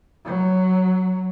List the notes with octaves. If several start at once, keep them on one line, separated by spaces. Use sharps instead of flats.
F#3